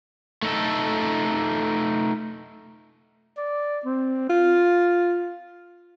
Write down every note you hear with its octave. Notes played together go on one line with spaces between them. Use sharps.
A3 D#4 A4
D5
C4
F4